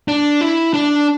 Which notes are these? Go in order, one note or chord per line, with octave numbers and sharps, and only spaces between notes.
D4
E4
D4